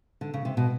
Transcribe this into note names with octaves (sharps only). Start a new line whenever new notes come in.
D3
C#3
C3
B2